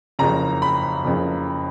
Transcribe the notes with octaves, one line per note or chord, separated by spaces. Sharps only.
F#1 F2 C#3 A#5
B5
F#1 F2 C#3